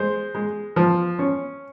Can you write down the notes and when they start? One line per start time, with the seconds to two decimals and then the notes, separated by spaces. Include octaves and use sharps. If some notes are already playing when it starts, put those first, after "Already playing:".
Already playing: G#3 C5
0.35 G#3
0.76 F3
1.19 C#4